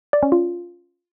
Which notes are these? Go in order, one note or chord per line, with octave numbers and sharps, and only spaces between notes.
D5
C#4
F4